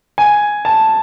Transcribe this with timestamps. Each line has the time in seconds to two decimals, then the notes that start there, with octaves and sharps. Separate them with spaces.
0.18 G#5
0.65 A5